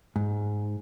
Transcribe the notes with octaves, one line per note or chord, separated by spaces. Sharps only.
G#2